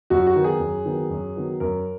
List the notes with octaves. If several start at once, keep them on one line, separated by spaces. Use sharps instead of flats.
F#2 F#4
F#4
D#3 F#3 B3
G#4
F#2
D#3 F#3 B3
F#2
D#3 F#3 B3
F#2 A#4